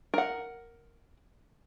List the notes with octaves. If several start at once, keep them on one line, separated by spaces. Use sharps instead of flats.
A#4 F#5